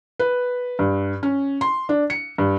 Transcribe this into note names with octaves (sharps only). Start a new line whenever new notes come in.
B4
G2
C#4
C6
D4
C#7
G2